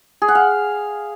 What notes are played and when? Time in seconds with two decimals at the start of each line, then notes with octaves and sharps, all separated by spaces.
0.22 G#4
0.28 F#5
0.35 F5